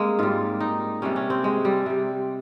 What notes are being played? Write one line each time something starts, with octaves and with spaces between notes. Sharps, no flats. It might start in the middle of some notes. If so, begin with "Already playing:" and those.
Already playing: G#3 A#3 C4
G#2 G3 F4
D#4
C3 G3 C#4
C#4
C4
G#3
G3
C3 G3